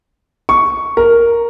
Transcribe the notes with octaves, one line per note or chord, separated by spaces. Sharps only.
C#6
A#4